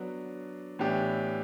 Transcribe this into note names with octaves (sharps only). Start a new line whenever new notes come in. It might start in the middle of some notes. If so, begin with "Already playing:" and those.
Already playing: F#3 B3 D4
A2 E3 B3 D4 G4